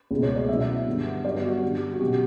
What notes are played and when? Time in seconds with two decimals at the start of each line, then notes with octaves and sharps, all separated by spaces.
0.11 C#2 B2 A3
0.23 C#5
0.36 D5
0.49 B2 F#3 C#4 E4 E5
0.87 G2 D3 G3 B3
1.25 G2 F#3 B3 D5
1.44 F#4
1.63 G2 D3 G3
1.93 F#4
2.00 B2 F#3 C#4 G4